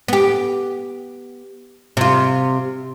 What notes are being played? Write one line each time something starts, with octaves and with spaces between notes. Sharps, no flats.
B3 G4
C3 F4